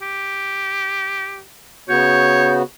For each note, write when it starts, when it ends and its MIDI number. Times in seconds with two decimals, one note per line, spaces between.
0.02 1.42 67
1.89 2.63 49
1.89 2.63 59
1.89 2.63 66
1.89 2.54 73
1.89 2.55 91